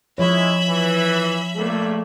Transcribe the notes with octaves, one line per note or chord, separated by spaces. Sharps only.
F3 G#3 E4 C#5 E5 B5
E3
A#1 G2 A3 A#3